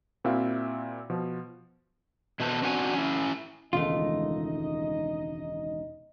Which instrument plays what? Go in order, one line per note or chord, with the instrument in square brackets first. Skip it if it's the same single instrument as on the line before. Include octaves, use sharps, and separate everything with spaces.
[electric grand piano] A#2 C4 E4 F#4 E5 F5
B2 F3
[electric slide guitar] B2 E4 A4 B4 C5
C4 D4 F#4 F5 G#5
C#4 E4
[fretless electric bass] E1 C#2 D#3 [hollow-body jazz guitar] A3 F4 [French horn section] D#4 D#5